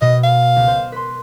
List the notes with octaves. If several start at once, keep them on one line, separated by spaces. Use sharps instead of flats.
B2 D#5
F5
C#2
C5
B4 C6